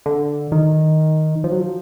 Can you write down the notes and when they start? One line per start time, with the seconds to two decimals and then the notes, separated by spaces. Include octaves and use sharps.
0.06 D3
0.52 D#3
1.44 F3
1.52 F#3
1.60 F3